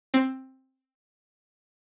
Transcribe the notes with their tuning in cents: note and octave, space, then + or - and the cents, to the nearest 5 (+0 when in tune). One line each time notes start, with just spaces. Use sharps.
C4 +10